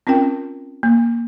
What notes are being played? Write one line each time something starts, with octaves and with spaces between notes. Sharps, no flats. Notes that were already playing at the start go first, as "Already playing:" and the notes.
C4 C#4 F4 A#4 G5
A#3